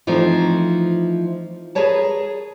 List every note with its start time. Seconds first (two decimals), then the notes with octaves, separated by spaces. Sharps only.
0.07 E3 F3 A3 C4 D#4
1.75 G#4 A#4 B4 C#5 A5